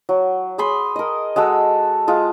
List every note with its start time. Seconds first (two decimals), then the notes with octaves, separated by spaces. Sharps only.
0.09 F#3
0.58 G#4 B5 C6
0.96 A#4 D#5
1.36 G#3 F#4 A4 E6
2.08 G#3 F4